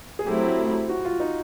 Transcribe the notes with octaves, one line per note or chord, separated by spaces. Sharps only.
G#4
F#3 A3 C4 E4 G4
F#4
F4
D#4